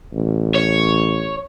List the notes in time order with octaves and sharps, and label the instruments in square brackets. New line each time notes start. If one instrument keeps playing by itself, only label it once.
[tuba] A1
[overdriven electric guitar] C#5